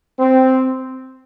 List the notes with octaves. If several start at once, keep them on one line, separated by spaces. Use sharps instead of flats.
C4